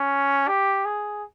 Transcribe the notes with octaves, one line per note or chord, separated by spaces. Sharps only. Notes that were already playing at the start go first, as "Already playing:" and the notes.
Already playing: C#4
G4
G#4